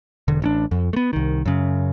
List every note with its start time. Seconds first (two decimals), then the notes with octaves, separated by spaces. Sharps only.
0.28 E1 D3
0.42 A1 C#4 D4
0.71 F2
0.93 A3 B3
1.13 C2 D#3
1.46 F#2 C#3